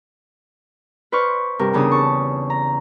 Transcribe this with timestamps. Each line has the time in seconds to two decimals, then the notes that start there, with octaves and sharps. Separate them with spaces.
1.12 B4 C5 D5 C#6 F6
1.59 G2 C3 A#4
1.73 E2 C#3 D4 G#4 D#6
1.91 A5 C#6
2.50 A#5